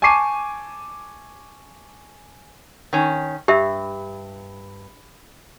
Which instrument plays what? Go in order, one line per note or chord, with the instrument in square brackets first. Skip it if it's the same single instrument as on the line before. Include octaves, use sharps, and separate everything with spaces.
[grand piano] G#5 A5 C#6 D6 C7 D#7
[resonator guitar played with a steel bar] D#3 C#4
[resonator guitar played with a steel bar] G2 [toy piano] G4 E5